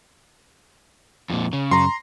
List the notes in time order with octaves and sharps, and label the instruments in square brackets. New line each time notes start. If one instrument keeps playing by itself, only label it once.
[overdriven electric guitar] F2 A#2
C#3
[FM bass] F#2 [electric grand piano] A#5 C6